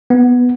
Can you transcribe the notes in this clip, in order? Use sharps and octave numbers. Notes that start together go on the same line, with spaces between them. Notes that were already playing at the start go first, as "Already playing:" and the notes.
B3